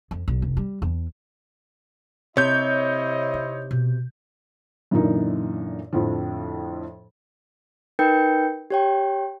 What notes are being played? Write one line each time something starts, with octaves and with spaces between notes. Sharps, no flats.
F2
B1
F1
G3
E2
C3 E4 C5 C#5 D#5 G6
D#4
B2
F#2 A#2 D3 E3 A#3 D#4
F2 A2 D3 F3
D#4 A#4 B4 G5 G6 C#7
G4 C#5 G5